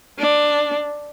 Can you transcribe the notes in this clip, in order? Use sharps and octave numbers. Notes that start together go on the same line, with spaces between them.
D4